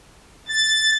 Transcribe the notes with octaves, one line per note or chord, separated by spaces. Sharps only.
A6